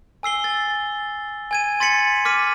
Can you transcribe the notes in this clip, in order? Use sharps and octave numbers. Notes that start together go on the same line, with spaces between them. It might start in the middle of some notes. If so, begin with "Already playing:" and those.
G#5 E6 C7 G7
A6
G#5 G#6 D#7
C6 A6 B6 C#7 F#7
D6 F6 B6 D#7